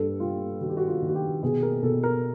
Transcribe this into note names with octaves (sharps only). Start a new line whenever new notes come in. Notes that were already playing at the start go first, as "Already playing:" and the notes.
Already playing: G2 A4
G3 F4
D#3 F#4
G4
F#4
F4
D#3
F#4
G4
B2 G#4
A#4
B2 A4
A#4